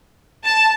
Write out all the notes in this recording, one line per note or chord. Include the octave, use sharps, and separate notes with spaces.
A5